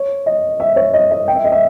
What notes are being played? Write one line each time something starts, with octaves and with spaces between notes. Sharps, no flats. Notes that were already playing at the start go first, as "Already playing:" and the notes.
Already playing: C#5
D#5
E5
C#5
D#5
D#5
G5
E5
D#5
E5